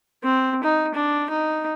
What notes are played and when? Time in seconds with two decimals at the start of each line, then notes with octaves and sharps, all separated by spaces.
0.23 C4
0.63 D#4
0.94 D4
1.30 D#4